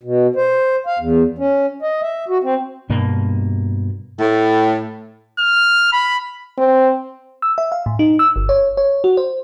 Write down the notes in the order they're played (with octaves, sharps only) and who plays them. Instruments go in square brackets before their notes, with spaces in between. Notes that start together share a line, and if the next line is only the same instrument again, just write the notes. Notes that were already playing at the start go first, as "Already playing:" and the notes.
[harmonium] B2
C5
F5
E2
C#4
D#5
E5
F#4
C4
[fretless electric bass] G2 B2 A#3
[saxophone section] A2
[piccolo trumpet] F6
B5
[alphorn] C4
[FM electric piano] E6
E5
F5
A2
D#4
E6
G1
C#5
C#5
F#4
C5